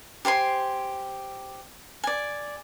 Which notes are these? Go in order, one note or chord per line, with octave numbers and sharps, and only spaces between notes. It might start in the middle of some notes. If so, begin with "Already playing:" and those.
G4 C5 G#5 C6
D5 G#5